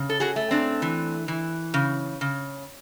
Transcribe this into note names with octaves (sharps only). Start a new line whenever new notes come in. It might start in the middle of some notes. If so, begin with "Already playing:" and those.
Already playing: C#3
A4
F#4 G#4
A3
C4 D4
E3
E3
C#3
C#3